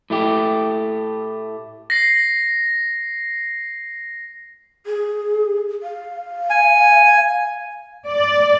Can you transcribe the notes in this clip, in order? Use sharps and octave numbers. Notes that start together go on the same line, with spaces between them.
A2 A3 G4
A#6 C7
G#4
F5
G#5
D5